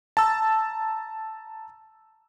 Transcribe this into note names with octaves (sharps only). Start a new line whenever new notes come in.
A5 A#5 E6